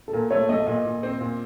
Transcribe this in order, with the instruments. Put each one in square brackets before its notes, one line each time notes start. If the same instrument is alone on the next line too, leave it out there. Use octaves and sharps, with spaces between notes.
[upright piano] A4
[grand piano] A#2 [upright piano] A#4
[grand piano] A3 [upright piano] C#5
[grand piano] A3 [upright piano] D#5
[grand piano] A#2 [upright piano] D#5
[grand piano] A#2
C4
A#2